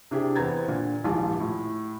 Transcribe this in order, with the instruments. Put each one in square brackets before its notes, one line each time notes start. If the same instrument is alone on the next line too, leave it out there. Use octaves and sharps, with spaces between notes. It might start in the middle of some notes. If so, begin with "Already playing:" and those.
[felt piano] C3 D4 E4 G4 G#4
E2 B3 C4 A#5 G#6 A6
A#2 D3
D#1 A#1 G#2 E3 F4 A5
A2